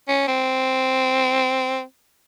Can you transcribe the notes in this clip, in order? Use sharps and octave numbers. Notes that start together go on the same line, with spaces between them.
C#4
C4